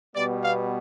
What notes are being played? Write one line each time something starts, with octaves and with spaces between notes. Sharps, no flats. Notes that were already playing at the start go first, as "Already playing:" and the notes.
B2 G3 B3 D5
F5